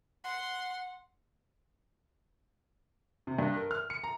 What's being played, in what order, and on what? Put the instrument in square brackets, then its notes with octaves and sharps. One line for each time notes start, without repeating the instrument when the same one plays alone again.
[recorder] F#5 [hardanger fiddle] C6
[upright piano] C3
G2
A#4
F6
C#7
A#5